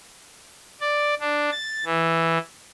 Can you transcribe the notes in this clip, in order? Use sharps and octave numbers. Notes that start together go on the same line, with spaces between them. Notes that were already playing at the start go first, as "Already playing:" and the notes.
D5
D4
A6
E3